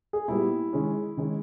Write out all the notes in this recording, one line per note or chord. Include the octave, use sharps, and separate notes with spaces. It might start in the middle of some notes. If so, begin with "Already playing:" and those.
G#4
A#2 G3 B3 E4 G4
D#3 G#3 C#4 G#4
D#3 G#3 C#4 G#4